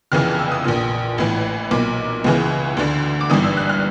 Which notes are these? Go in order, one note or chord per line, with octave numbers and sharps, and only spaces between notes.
F1 F2 C#3 E3 F6
F6
E6
D#6
A#1 A#2 D#6
A1 A2 E3
B1 A#2 D6
C#2 C#3 E3
D2 D3
D6
G#1 G2 E3 D#6
E6
F#6
F6